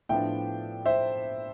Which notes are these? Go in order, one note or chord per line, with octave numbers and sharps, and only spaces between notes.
A2 F3 B3 D4 E5 G5
C5 E5